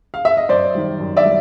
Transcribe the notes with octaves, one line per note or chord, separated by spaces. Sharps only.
F5
E5
D#5
F#2 C5 D5
D#3 G3
F#2
D5 E5
G3